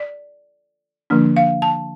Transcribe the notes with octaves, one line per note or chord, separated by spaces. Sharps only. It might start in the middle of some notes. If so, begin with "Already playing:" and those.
Already playing: D5
D3 F3 A#3 D4
F5
A5